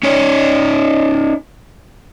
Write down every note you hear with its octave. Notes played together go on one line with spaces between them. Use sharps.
C#4 D#4 C#5